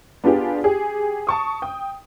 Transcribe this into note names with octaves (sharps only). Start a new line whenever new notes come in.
B3 D4 F4 G4 G#4
G4 G#4
A5 C#6 D#6
G5 D#6